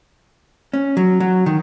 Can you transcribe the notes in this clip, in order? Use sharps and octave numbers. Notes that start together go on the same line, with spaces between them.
C#4
F#3
F#3
D#3